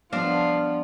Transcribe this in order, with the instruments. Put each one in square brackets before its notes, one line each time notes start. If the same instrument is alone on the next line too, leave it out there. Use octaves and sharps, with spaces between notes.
[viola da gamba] F3 [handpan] G3 B3 [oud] D4 [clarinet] F5